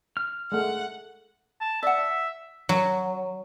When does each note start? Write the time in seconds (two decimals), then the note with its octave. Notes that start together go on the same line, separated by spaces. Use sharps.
0.17 F6
0.52 G#3 A3 F#5
1.61 A5
1.83 D5 E5 F#5
2.69 F#3